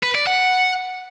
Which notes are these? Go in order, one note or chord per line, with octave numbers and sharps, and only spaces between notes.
B4
D5
F#5